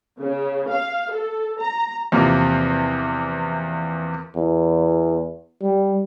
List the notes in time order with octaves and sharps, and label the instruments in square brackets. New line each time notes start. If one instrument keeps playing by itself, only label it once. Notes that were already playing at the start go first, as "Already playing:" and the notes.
[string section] C#3
F5
A4
A#5
[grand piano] E2 C3 F3 A#3
[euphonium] E2
G3